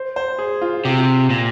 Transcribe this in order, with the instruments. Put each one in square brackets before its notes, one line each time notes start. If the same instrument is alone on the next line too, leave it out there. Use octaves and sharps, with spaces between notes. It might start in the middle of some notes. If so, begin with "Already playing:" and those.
Already playing: [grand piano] C5
C5
G#4
F4
[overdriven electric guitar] C3 [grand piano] G4
[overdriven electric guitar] A#2